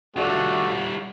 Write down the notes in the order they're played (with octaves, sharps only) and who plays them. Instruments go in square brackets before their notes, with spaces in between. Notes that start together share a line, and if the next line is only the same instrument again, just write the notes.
[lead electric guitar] G3 F4 [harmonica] A3 D4 [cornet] F#4